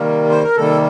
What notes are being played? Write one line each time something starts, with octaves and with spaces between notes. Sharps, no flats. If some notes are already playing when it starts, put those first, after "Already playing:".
Already playing: C3 D#3 G3 A#3
C5
A#4
C3 D#3 G3 A#3 A4